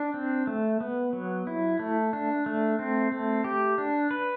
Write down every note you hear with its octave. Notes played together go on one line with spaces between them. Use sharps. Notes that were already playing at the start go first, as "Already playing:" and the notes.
Already playing: D4
C4
A3
B3
F#3
E4
A3
D4
A3
C4
A3
G4
D4
B4